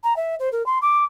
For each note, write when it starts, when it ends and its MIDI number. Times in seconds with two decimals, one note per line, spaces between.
0.04 0.16 82
0.16 0.35 76
0.40 0.49 72
0.52 0.65 70
0.66 0.79 84
0.82 1.04 86